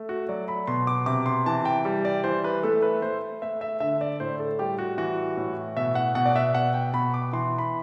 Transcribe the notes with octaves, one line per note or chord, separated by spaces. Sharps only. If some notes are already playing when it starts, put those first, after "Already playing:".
Already playing: A3
F#4
F#3 D5
B5
B2 C6
D6
C3 D6
C6
E3 A5
G5
G3
D5
E3 C5
B4
A3 A4
B4
A3 C5
A3 E5
E5
D3 E5
D5
A2 C5
A4
G3 G4
F#4
E3 F#4
A2
B2 E5
F#5
B2 F#5
D5
E5
B2 F#5
G5
B2 B5
D6
E3 C6
B5